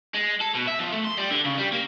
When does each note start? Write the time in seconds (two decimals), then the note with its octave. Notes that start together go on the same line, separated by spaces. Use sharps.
0.15 G#3
0.41 A4
0.55 B2
0.68 E5
0.79 F3
0.92 A3
1.05 C6
1.18 G3
1.31 D3
1.45 C#3
1.58 G3
1.72 A#3